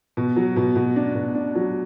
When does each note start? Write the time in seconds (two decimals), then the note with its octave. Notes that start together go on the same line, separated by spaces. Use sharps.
0.17 B2
0.36 F#3
0.56 B2
0.76 B2
0.96 D4
1.15 B2
1.35 D4
1.55 F#3